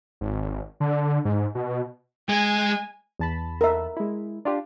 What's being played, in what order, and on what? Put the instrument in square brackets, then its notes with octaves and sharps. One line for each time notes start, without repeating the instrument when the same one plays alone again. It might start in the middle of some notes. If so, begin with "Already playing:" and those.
[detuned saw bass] G#1
D3
G#2
B2
[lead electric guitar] G#3 [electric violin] G#5
[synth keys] E2 A5 B5
[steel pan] A#4 E5
[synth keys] G#3 E4
D4 F4 G4